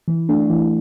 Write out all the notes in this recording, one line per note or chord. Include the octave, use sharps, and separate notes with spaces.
E3
A3 D4
E3